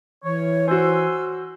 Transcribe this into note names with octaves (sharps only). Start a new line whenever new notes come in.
E3 C#5
F#4 C5 G#5 C6 E6